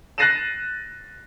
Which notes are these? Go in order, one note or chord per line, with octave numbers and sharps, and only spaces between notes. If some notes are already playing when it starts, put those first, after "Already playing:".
F#6 A6 A#6 C7 D#7 E7